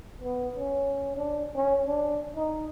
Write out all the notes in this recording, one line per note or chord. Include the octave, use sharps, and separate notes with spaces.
B3
C#4
D4
C#4
D4
D#4